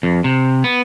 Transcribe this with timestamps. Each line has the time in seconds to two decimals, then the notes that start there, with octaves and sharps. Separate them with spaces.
0.03 F2
0.24 C3
0.64 B3